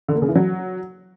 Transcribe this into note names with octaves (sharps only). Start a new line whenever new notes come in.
D3
A#3
C#3
E3
F#3